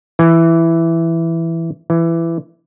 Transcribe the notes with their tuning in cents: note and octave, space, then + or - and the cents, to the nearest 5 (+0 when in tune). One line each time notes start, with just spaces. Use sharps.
E3 +5
E3 +15